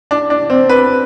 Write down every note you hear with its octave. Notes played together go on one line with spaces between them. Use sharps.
D4
D4
C4
B4